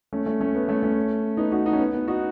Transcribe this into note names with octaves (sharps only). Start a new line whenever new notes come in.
A3 C#4
A3 C#4
A3 C#4
B3
A3 C#4
A3 C#4
B3 D#4
D#4 F#4
D#4 F#4
C#4
B3
B3
D#4 F#4